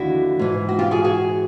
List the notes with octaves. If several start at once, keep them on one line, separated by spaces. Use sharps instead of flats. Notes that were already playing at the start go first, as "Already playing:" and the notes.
Already playing: D#2 D3 F3 E4 F#4
G#2 E3
F#4
F4 G4
F#4 G#4
F#4 G#4